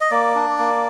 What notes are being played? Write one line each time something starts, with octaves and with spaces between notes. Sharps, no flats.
D#5
A#3 D5
D4
A#3